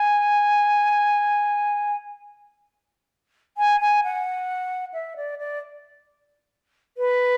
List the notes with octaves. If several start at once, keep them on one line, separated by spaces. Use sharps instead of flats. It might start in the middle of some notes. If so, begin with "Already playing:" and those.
Already playing: G#5
G#5
G#5
F#5
E5
D5
D5
B4